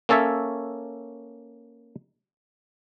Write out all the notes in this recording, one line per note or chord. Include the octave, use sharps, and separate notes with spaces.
A#3 C#4 A4 C#5 E5